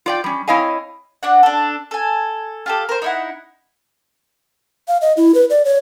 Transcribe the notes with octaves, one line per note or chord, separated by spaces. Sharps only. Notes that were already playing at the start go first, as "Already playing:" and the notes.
F4 D5 G5
G3 C#4
C4 E4 C#5 D#5 F5 G#5
D4 F#4 F#5
D4 A4
A4 G#5
F4 G4 A4
A#4 C5
D#4 E4 F#5
F5
D#5
E4
B4
D5
C#5